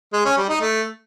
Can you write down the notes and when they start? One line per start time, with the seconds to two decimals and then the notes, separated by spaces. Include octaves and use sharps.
0.13 G#3
0.25 C#4
0.37 G3
0.49 D#4
0.61 A3